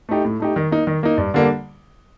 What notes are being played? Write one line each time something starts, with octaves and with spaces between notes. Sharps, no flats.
A3 D#4 G4
A2
A3 D#4 G4
D#3
A#3 D#4
D#3
A#3 D#4
G2
D3 G3 A#3 D4